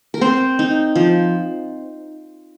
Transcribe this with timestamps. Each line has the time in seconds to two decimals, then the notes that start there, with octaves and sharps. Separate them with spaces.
0.14 A#4
0.21 C4 C5
0.59 D#4
0.95 F3